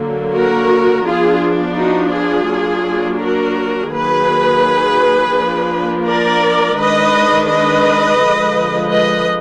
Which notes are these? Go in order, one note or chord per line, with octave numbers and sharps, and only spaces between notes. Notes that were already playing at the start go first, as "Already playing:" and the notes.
Already playing: D3 F#3 A#3
F#4 A#4
F3 B3 D4 F4 G#4
D#4 F#4
F4 G#4
F#3 A#3 D4
F#4 A#4
D#3 F#3 A#3 G#4 B4
F3 A#3 D4
A#4 D5
D#3 G#3 D4 B4 D#5
B4 D#5
D3 F3 G#3
B4 D#5